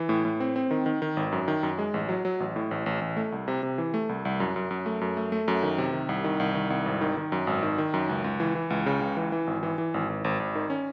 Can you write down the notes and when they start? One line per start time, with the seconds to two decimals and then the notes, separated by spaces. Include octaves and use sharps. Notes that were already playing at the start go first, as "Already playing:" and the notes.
Already playing: E3
0.09 A2
0.25 A2
0.40 C4
0.56 C4
0.71 D#3
0.86 D#3
1.02 D#3
1.17 G#1
1.32 F#2
1.48 D#3
1.63 F#2
1.79 G#3
1.94 A1
2.09 F#3
2.25 F#3
2.40 A1
2.56 A2
2.71 A1
2.86 A1
3.01 A1
3.17 A3
3.32 C2
3.48 C3
3.63 C3
3.78 E3
3.94 A3
4.09 C2
4.25 C2
4.40 F#2
4.56 F#2
4.71 F#2
4.86 A3
5.01 F#2
5.17 A3
5.32 A3
5.48 F#2
5.63 D#3
5.78 C3
5.93 D#3
6.09 C2
6.24 D#3
6.40 C2
6.55 D#3
6.70 C2
6.86 G#1
7.01 D#3
7.17 D#3
7.32 F#2
7.47 G#1
7.63 D#3
7.78 D#3
7.94 F#2
8.09 C#2
8.24 C#2
8.40 E3
8.55 E3
8.70 C#2
8.86 C#3
9.01 C#2
9.17 E3
9.32 E3
9.47 G#1
9.63 E3
9.78 E3
9.94 G#1
10.09 G#1
10.24 G#1
10.40 G#1
10.55 D#3
10.70 C#4